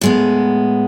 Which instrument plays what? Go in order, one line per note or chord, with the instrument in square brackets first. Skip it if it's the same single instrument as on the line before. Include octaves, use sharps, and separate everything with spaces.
[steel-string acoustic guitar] A2 G#3 B3